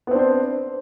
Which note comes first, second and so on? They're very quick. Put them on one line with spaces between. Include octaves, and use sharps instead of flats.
B3 C4 D4 C5